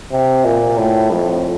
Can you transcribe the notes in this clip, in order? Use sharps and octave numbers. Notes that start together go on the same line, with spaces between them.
C3
A#2
A2
F2